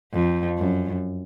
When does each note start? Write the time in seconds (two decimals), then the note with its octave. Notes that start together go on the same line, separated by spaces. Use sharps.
0.13 F2
0.58 F#2